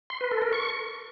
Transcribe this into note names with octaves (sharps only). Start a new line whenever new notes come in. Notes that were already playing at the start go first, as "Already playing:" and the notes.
C6
B4
A4
A#4
C#6